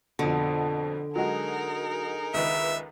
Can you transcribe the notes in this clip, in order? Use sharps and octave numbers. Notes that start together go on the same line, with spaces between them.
F2 B2 D3
F#3 G#3 D#4 F#4 G#4 A#4
C#2 D#3 B4 E5